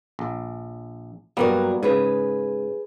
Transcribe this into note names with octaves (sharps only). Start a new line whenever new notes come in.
A#1
G2 F#3 G3 A#3 B3 A#4
G#2 C#3 G#4 B4